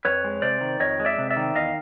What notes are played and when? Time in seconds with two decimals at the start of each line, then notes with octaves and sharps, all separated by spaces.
0.05 F2 B4 C#5
0.24 G#3
0.42 C3 C5 D5
0.61 D#3
0.80 F2 C#5 D#5
1.00 G#3
1.05 D5 E5
1.19 C3
1.30 D5 E5
1.36 D#3
1.55 E2 D#5 F5